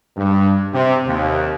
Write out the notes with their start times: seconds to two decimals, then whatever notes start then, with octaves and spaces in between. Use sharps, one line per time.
0.17 G2
0.74 C3
1.06 D#2